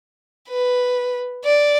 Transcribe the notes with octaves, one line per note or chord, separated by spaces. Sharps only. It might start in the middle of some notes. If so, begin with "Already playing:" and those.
B4
D5